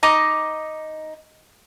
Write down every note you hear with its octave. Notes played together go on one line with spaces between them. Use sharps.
D#4 D#5 A#5 D6